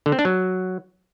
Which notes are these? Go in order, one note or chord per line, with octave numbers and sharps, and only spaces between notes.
D3
C4
D4
F#3